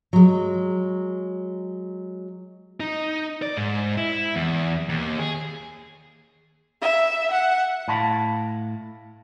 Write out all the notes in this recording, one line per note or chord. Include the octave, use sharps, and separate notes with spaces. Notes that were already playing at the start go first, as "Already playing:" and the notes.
F#3 G#3
D#4
D5
G#2
E4
E2
D#2
G#4
E5
F#5
A2 F5 A5 B5